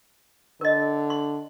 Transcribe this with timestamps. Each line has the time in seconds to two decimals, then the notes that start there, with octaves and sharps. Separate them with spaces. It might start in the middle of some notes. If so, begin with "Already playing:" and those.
0.61 D3 A#4 D#5
1.10 C6